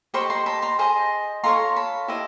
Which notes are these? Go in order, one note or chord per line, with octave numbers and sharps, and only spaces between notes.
G4 C5 D#5 B5 C#6
A#5 C6
A5 B5
A#5 C6
G#4 C5 D#5
F4 A4 C#5 A#5 C6
A5 B5
E4 G4 C5 D#5